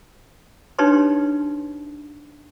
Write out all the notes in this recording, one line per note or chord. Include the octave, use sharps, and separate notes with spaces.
D4 D#4 G4 B4 C#5 C6